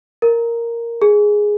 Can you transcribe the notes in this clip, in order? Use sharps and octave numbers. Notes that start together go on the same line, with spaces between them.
A#4
G#4